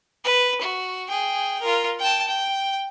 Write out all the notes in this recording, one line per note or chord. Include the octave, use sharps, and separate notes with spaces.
B4
F#4
G#4 G5
F4 A#4
G5 A5
G5